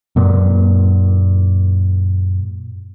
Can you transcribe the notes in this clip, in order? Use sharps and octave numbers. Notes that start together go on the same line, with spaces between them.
F#2 A#2